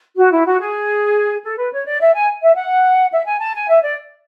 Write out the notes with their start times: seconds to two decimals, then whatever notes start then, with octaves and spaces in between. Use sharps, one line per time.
0.17 F#4
0.31 E4
0.46 F#4
0.59 G#4
1.44 A4
1.58 B4
1.72 C#5
1.86 D5
2.00 E5
2.14 G#5
2.42 E5
2.56 F#5
3.12 E5
3.26 G#5
3.40 A5
3.55 G#5
3.68 E5
3.82 D5